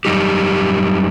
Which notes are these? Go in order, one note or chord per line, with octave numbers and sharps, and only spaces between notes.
F#2 E3 G3 D#4 G4